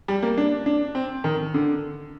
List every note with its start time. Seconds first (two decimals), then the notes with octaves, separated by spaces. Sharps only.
0.08 G3
0.22 A#3
0.38 D4
0.66 D4
0.95 C4
1.24 D#3
1.54 D3